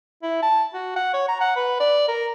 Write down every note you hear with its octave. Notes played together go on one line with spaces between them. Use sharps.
E4
A5
F#4
F#5
C#5
A#5
F#5
B4
D5
A#4